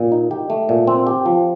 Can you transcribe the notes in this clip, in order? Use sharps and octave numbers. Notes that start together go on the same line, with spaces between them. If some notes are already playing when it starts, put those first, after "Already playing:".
Already playing: A#2
D#4
G4
A3
A#2
C4
G4
F3